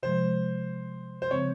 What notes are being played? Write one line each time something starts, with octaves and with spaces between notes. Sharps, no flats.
C3 F3 G#3 C5
C5
C#3 F3 G#3 C4 C#5